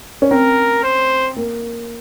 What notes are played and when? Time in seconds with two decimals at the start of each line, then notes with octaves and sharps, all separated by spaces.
0.22 C#4
0.31 C4 A#4
0.84 C5
1.36 A#3